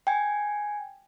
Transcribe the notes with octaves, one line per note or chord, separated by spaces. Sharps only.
G5 G#5